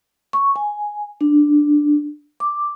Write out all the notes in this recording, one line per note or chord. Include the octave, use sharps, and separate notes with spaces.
C#6
G#5
D4
D6